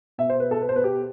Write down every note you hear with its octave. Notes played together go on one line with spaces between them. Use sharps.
B2 E5
C5
B4
A4
B4
C5
B4
G4